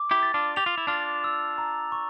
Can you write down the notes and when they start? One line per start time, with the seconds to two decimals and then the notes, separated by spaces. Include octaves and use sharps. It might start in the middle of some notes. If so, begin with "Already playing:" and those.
Already playing: D6
0.11 E4 G4
0.23 A6
0.34 D4 F4
0.56 G4 F7
0.66 F4
0.78 E4
0.87 D4 F4 A6
1.24 E6
1.58 A#5
1.92 C#6